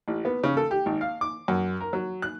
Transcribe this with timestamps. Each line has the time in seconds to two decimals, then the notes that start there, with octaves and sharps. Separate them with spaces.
0.08 A1
0.25 B3
0.44 C#3
0.57 A4
0.71 G4
0.86 G#1
1.01 F5
1.21 D6
1.48 F#2
1.80 A#4
1.93 F#3
2.22 F#6